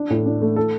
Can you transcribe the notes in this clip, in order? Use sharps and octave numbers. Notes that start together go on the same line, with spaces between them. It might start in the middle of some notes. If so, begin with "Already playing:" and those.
Already playing: D4
A2
D4
A3
A4